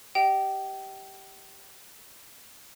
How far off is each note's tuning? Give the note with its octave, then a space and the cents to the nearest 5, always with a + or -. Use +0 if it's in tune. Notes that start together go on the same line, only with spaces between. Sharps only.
G4 +0 D#5 +0 G5 -30